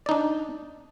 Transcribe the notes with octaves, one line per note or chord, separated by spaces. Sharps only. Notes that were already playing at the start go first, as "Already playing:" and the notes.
D4 D#4 D5